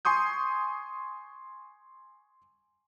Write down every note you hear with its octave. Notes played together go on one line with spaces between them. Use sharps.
G#5 C6 C#6 D#6 G6